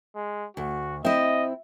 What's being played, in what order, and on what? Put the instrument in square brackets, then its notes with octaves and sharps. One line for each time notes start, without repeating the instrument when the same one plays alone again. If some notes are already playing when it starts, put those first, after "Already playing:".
[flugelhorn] G#3
[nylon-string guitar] D2 [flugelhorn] F#4
[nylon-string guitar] C4 E4 [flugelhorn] D#5 [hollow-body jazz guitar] E5